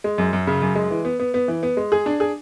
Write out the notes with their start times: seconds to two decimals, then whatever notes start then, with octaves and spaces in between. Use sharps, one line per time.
0.04 G#3
0.18 F#2
0.33 F#2
0.47 C#3
0.62 F#2
0.75 G#3
0.90 E3
1.05 B3
1.20 B3
1.34 B3
1.48 E3
1.63 B3
1.77 G#3
1.92 G#4
2.06 D4
2.20 G#4